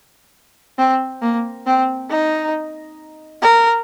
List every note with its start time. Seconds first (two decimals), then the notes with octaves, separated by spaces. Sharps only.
0.78 C4
1.22 A#3
1.67 C4
2.10 D#4
3.42 A#4